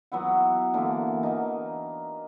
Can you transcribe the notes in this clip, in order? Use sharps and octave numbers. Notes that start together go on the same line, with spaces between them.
F#3 B3 E4 F#5
D3 E3 A#3
D#4 A#4